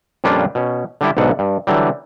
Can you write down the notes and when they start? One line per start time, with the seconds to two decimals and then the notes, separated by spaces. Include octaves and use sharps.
0.24 F2 A#2 G3 C#4 D4 F4
0.55 B2 C#4
1.01 D3 G3 E4
1.17 B1 G#2 B2 D3 F#5
1.39 G2
1.67 D3 E3 F#3 G3